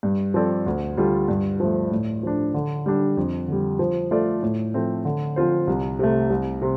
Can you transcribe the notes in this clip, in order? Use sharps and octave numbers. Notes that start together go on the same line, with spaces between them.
G2
F3 C4 A4 D5
D2
D3 G3 F4 A4
G2
F3 A3
A2
F3 D4
D3
G3 D4
F2
D3 G3
F3
A3 F4 A4 D5
A2
F3 A3 C4
D3
F3 C4 F4 C5
C2
C3 A3
C2
C3